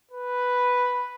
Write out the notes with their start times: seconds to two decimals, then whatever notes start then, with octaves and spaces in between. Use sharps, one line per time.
0.12 B4